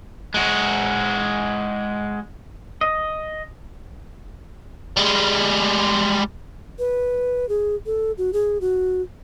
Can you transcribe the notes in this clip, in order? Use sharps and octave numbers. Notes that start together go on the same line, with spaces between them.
G#3 F#4
D#5
G3 G#3
B4
G#4
A4
F#4
G#4
F#4